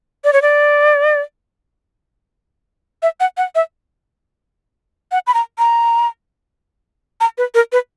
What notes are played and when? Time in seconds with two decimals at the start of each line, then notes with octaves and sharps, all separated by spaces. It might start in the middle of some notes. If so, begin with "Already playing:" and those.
0.24 D5
0.33 C#5
0.42 D5
3.03 E5
3.20 F#5
3.37 F#5
3.55 E5
5.12 F#5
5.27 B5
5.34 A#5
5.59 A#5
7.20 A#5
7.38 B4
7.55 A#4
7.72 B4